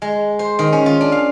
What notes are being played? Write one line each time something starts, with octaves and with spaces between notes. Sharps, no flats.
G#3
C5
D#3
C#4
F4
D4
F5